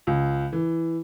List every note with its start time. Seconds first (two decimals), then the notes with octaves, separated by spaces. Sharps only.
0.07 C#2
0.53 E3